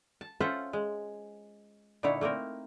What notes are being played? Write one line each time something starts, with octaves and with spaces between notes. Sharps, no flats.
A5
C#4 F4 A4 C5 E5 F#5
G#3
A#2 D3 D#4 E4 C#5
A3 A#3 C4 A#4